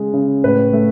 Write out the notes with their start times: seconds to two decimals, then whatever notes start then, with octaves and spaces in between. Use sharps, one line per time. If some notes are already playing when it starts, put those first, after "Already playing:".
Already playing: C#3 G#3
0.14 C#3
0.44 A2 B4
0.73 A3